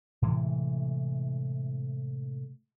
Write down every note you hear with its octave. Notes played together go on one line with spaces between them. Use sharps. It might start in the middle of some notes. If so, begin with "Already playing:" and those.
A2 C3 E3 G#3